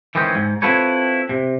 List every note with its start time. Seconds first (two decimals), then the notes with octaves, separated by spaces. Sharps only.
0.15 D#3 E3 G#3 C4 C#4
0.35 G#2
0.62 C4 E4 F4 A4 B4 C#5
1.29 C3